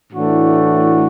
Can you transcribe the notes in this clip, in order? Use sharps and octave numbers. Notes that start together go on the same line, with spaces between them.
A2 E3 A3 D4 F#4